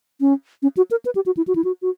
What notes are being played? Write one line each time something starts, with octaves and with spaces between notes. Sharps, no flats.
C#4
C#4
F#4
A#4
B4
G4
F#4
E4
F#4
E4
F#4
F#4